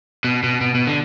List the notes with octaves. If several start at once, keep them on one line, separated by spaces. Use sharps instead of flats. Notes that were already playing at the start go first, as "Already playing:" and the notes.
B2
B2
B2
B2
D3